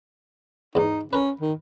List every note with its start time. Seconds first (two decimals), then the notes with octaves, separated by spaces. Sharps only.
0.75 E2 G#2 D#4
1.13 C#4 A#4 B4
1.41 D#3